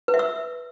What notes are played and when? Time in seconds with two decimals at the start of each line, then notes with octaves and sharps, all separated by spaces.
0.08 B4
0.14 E5
0.19 E6